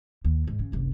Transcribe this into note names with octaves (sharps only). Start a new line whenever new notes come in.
D#2
G#2
C#3
F#1 C2